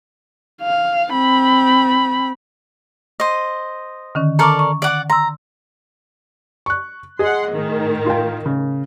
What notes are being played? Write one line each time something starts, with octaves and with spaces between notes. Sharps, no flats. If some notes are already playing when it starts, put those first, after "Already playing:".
F5
C4 B5
C5 D#5
D3 D#3 C#4
A4 A#4 D5 A#5 C#6 D6
C#6
D5 F#5 D6
A#5 C6 E6
C#6 F#6
G#4 D#5 F#5 C6
A2 D#3
F4 G5
C#3